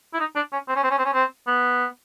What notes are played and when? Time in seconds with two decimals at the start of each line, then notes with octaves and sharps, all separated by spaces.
0.14 E4
0.20 D#4
0.36 D4
0.53 C#4
0.69 C4
0.76 C#4
0.84 C4
0.91 C#4
0.98 C4
1.05 C#4
1.14 C4
1.47 B3